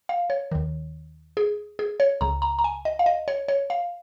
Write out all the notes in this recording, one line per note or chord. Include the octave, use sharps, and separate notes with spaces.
F5
C#5
D#2 D#3
G#4
G#4
C#5
C#2 C#3 A#5
A#5
A#5
G#5
D#5
F5
D#5
C#5
C#5
F5